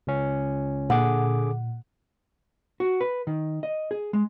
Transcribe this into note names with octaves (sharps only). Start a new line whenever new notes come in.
C#2 C#4
A#2 D3 G#4 F#5 D6
F#4
B4
D#3
D#5
G#4
G#3